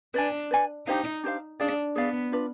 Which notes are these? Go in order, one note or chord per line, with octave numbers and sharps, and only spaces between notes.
D4 B4 D5 G#5
B4 D5 G#5
D4 D#4 G4 C5 F5
D4 G4 C5 F5
D4 G#4 D5 F5
B3 G#4 D5 F5
D4 F4 B4